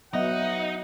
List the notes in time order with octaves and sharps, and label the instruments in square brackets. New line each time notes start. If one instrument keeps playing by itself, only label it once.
[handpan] F#3 B3 D#5 [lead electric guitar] D#4 [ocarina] E5 [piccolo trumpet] F#5